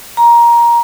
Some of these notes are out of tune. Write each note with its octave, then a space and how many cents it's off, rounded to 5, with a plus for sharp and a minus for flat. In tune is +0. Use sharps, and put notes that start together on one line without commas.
A#5 +15